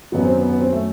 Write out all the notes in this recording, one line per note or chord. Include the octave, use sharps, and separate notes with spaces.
F#2 D#3 F#3 B3
C4
B3
B3
C4
A3